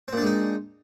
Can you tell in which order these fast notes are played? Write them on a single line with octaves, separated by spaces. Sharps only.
C4 A#2 D4 G#3 D#4